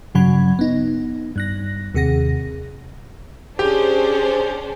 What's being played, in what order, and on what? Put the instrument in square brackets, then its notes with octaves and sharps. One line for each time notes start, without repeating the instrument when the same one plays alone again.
[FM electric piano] G2 C#3 F#3 F#5 B5 G#6
B3 D#4
G2 F#6 A#6
D#2 C3 G#4 F#5 A#6
[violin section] C#4 D4 C5 [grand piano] G4 [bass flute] G#4